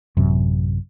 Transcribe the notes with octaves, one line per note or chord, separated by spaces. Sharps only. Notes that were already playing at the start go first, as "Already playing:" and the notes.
A1 F#2 C3